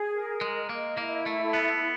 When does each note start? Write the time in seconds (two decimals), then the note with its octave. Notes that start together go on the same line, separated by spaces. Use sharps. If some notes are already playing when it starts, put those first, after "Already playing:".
Already playing: G#4
0.13 A#4
0.41 G#3
0.55 D#5
0.69 A#3
0.97 A#3 E4
1.26 A3
1.40 A4
1.53 B3